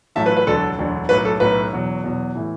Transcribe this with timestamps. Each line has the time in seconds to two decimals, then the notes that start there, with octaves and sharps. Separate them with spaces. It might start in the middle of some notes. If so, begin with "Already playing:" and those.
0.16 A1 A2 F#3 E5 A5
0.26 B4
0.37 B4
0.47 E1 D2 D3 F#3 A4
0.78 E1 D2 D3 F#3
1.09 B1 A2 F#3 B4
1.25 A4
1.40 B1 A2 F#3 B4
1.72 E2 B2 F#3
2.04 E2 B2 F#3
2.35 A2 E3